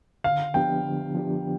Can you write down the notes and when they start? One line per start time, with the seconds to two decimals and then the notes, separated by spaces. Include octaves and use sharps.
0.24 D3 F5
0.54 F3 B3 D4 G4 G5
0.84 D3
1.14 F3 B3 D4 G4